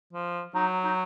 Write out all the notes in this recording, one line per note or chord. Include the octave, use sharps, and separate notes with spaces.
F3
F#3 D#4
D#4